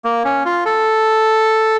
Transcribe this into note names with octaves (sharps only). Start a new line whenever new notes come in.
A#3
C#4
F4
A4